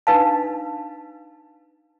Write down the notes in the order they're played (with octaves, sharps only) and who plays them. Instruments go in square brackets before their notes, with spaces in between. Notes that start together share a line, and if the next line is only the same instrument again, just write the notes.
[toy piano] D4 D#4 B4 F5 A5